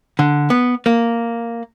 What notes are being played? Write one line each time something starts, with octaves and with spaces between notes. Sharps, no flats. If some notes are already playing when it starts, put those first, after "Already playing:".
D3
B3
A#3